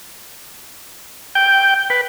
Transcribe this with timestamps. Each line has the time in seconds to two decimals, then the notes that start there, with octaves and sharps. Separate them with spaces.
1.35 G5
1.90 B4